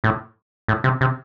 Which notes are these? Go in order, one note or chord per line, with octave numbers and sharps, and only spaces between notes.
A2
A2
C3
C3